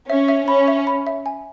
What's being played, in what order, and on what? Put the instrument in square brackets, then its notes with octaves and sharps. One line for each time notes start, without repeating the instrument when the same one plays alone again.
[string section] C#4 [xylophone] E5
[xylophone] E5
[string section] C#4 [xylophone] B5
[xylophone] E5
B5
E5
G#5